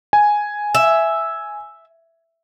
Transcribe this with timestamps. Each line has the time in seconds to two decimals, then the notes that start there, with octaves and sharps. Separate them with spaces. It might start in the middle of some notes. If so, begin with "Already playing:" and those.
0.13 G#5
0.75 E5